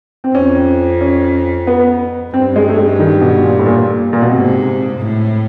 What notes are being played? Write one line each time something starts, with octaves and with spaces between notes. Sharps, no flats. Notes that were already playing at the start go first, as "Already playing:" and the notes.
C4
F2 C#4
C#4
B3
G2 C4
G#3
A3
G#3
D#3
B2
A#2
A2
A#2
A#2
B2
G#2 C3
A2